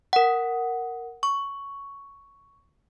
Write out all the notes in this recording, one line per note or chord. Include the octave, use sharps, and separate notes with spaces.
A#4 F#5
C#6